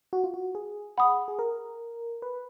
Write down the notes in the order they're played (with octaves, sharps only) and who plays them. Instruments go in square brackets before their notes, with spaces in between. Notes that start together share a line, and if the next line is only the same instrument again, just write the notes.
[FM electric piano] F#4
F4
F#4
G#4
[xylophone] F#5 B5 D#6
[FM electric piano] G#4
A#4
B4